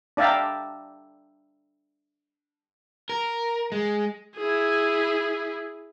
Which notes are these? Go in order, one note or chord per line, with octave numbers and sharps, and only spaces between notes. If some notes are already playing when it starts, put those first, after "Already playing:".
D4 D5 E5 F5 G5 A#5
A#4
G#3
E4 G#4